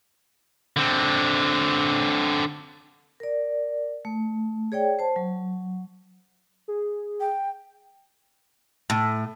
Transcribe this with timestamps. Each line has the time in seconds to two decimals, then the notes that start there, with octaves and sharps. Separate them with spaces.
0.77 D3 C4
3.20 A#4 D5
4.05 A3
4.72 G#4 C#5 D5 G5
4.99 C5 A5
5.16 F#3
6.68 G#4
7.20 G5
8.90 A2